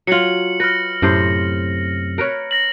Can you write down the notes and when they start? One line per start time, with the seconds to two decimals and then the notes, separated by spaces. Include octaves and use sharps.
0.07 F#3 F4 C#7 F#7
0.60 B4 F6 A#6
1.02 F#2 A2 C3 C5
2.18 A#4 B4 C#5
2.51 A#6 F#7